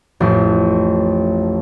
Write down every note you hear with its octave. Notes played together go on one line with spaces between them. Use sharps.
A1 F2